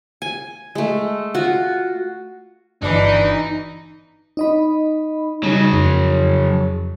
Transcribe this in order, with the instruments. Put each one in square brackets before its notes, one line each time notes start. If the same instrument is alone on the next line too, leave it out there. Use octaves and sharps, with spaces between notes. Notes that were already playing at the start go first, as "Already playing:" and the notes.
[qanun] G#5
G#3 A3
F4 F#4
[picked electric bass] G1 [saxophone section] B2 D4 [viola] E3 [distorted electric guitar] D#4
[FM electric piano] D#4 D#5 B5
[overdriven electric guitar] C#3 F#3 [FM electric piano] G3 D#4
[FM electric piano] F2